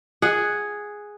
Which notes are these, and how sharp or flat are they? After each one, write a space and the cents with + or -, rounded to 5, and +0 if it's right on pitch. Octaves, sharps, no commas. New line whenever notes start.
G#4 +0 F#5 +0